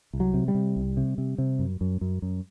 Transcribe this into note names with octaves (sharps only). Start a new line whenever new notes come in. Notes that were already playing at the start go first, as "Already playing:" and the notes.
C2
F#3
C3
G3
C3
C2
C3
C3
C3
F#2
F#2
F#2
F#2